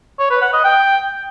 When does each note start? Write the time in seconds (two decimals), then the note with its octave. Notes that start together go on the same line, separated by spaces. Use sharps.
0.19 C#5
0.31 B4
0.42 F#5
0.53 D#5
0.64 G5